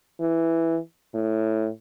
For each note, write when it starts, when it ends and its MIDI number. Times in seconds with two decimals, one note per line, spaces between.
0.20 0.78 52
1.14 1.69 45